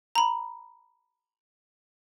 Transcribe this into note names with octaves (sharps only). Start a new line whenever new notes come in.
A#5 B5